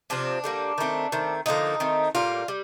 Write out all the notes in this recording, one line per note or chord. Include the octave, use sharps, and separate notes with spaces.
C3 F3 C4 D4
D3 G3 A#3
D#3 A3 C4
D#3 A3 C4
D3 F3 A#3 D#4
D#3 A3 C4
A2 G3 A#3 F4
G3